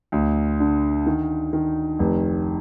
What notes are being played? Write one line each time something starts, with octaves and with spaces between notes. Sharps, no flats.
D2
D3
D#3
D#3
F1